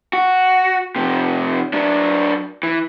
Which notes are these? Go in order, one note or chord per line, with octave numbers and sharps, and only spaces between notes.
F#4
C3 F3
F#3 D4
E3